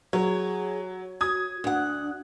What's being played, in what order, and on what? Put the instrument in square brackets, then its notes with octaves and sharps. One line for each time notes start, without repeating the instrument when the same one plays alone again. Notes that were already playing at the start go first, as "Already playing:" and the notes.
[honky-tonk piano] F#3 [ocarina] G#4 [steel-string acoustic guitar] C#5
[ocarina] F#4 [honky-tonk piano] D#6 G#6
[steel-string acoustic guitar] D2 F#5 [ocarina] D4